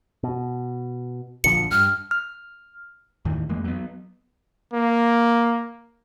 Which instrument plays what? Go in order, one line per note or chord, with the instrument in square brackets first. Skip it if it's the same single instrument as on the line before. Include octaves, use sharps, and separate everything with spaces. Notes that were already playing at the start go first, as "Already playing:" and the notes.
[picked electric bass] B2
[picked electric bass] A#1 D3 F3 [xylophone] C#7
[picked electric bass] G2 [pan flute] F6
[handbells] F6
[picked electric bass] D#2 A2 D#3 E3
F2 E3 G#3 A#3
F#3 B3
[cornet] A#3